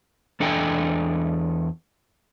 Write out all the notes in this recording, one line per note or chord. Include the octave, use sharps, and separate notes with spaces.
E2 D4 A4 D#5 G5 G#5